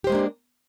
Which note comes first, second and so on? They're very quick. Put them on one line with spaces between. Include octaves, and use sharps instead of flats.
G4 C5 G#3 A#3 D4